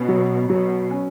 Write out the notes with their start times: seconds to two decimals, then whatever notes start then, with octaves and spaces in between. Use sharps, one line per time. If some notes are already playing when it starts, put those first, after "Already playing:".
Already playing: B2 C#4
0.09 F#3
0.50 B2 F#3
0.91 C#4